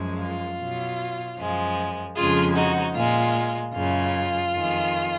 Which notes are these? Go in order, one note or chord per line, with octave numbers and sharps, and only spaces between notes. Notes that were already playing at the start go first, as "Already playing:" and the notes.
Already playing: F#2 F3 G#3
F4
B2 F#3
F#2 F3 G#3
F2 C#3 F3 G#3 F4 G#4
D#4 F#4
A#2 G#3 F4
F#2 C#3 G#3 F4
F2 D#3 G#3